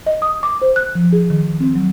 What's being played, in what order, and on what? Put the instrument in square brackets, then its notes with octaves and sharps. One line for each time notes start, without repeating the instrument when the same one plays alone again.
[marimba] D#5
D#6
D6
C5
F#6
F3
G#4
D#3
C4
F#3